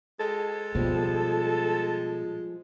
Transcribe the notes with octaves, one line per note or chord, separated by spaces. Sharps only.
G#3 A4
B2 F3 G3